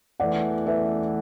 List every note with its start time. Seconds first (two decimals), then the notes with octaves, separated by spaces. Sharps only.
0.20 E2 E3 A3 D5 F#5
0.66 B4 E5